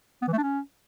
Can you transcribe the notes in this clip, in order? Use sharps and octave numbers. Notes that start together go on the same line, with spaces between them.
B3
E3
A3
D4
C#4